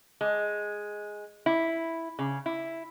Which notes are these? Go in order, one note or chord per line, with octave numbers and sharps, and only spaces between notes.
G#3
E4
C#3
E4